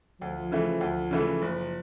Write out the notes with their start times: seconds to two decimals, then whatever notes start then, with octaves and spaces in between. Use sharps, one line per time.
0.21 D2 F3
0.51 C#3 E3 A3
0.81 D2
1.11 C#3 E3 A3
1.42 F#1